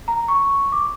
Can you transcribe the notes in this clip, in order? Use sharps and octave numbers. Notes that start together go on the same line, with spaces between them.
A#5
C#6
D6